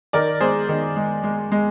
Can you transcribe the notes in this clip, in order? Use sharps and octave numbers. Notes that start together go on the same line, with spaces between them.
D#3 A#4 D5
G#3 G#4 C5
D#3
G#3
G#3
G#3